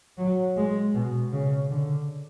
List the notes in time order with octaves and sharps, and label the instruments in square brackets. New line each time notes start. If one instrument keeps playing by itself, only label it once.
[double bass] F#3
G#3
B2
C#3
D3